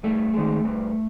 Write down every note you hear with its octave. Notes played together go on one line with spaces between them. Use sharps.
G2 A3
D#3 G#3
G2